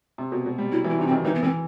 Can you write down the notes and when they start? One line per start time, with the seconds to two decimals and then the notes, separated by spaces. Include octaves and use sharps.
0.18 C3
0.32 B2
0.46 B2
0.58 G3
0.72 F#3 E4
0.84 E3
0.90 E4
0.99 C3 D#4
1.07 C4
1.11 D#3
1.25 E3 D#4
1.35 B3
1.43 E3 C4